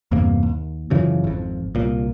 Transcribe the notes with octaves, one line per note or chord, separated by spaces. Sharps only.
E2 G2 C3 A#3
D#2
F#2 C#3 E3 F3
G#1 F2
C2 A#2